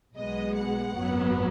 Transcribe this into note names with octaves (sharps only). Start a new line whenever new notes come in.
B1 B2 G#3 B3 D#5
F#5
G#1 F#2 F#3 B3